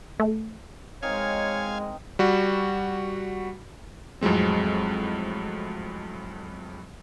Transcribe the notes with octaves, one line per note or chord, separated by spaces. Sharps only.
A3
G#3 C4 D#4 A#4 C#5 F5 G#5
G3 F#4
F2 A2 F#3 G#3 C4